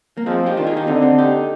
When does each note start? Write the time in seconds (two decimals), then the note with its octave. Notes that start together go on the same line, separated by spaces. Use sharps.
0.17 A#3
0.26 F3 G#3 C4
0.46 D#4 G4
0.56 D#3 D4 F4
0.67 F4 G#4
0.76 D#4 G4
0.87 D3 C4 D#4
1.02 C4 D#4
1.18 D#4 G4